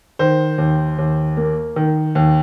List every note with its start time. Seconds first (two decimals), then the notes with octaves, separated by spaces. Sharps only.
0.19 D#3 C5
0.58 D#2
0.98 D#2
1.37 A#3
1.76 D#3
2.15 D#2